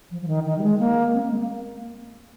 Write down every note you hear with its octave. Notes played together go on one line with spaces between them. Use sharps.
F3
F3
D#3
D#3
G3
G#3
A#3
C4
A#3
G#3
A#3